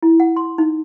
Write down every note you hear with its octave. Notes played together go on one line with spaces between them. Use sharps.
E4
F#5
C6
D#4